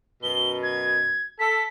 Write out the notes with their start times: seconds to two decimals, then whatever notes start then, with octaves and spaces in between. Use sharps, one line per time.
0.23 F#2 B2 G7
0.63 G#6
1.39 A4 B6